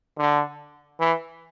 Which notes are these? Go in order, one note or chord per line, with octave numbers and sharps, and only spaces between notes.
D3
E3